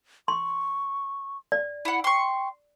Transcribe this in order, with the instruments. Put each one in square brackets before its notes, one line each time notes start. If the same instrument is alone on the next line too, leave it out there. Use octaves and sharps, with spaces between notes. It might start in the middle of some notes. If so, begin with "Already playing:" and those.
[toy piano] C6 [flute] C#6
[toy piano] D5
[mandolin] E4 F#5
[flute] G5 [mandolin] C6 C#6